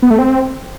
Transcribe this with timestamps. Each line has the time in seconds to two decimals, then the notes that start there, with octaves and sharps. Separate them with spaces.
0.02 B3
0.11 A3
0.19 C4